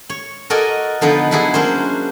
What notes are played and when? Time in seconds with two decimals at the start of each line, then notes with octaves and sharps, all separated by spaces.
0.10 C#5
0.50 F#4 A4 A#4 D5 D#5 G#5
1.01 D3 F3 B3 D#4 B4
1.31 F#3 D4 E4 F#4 G#4 F#5
1.54 A#3 C#4 D4 C5